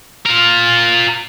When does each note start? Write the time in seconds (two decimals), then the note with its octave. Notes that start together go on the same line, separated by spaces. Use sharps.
0.26 F4 A#4